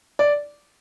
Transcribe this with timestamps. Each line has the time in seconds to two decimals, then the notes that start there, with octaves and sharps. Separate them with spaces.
0.19 D5